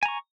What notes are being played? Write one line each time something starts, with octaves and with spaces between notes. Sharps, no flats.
G#5 A#5 C#6